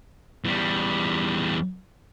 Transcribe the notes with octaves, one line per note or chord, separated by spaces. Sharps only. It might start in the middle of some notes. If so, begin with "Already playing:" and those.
E2 G3